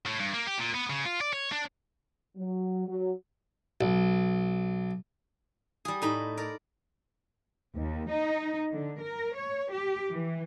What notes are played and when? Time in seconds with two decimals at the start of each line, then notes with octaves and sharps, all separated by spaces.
0.06 A2
0.20 G2
0.34 A#3
0.47 G4
0.59 A#2
0.75 B3
0.90 C#3
1.05 F4
1.21 D5
1.33 C#5
1.52 D4
2.37 F#3
2.88 F#3
3.81 B1
5.85 G3 G#4
6.02 A2 D#4 B5
6.37 A#4 D5
7.75 D#2
8.10 D#4
8.73 D3
9.02 A#4
9.37 C#5
9.73 G4
10.12 E3